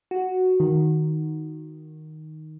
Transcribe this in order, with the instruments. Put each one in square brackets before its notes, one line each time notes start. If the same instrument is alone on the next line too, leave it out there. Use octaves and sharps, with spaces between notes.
[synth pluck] F#4
D#3